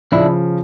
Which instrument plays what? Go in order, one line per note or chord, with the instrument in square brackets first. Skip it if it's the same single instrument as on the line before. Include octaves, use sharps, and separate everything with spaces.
[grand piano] C#3 F3 [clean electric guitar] D4 E4